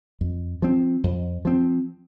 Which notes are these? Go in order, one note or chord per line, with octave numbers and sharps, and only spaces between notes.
F2
F3 C4
F2
F3 C4